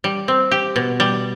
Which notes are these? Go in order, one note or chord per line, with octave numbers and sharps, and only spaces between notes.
G3
C4
G4
B2
G3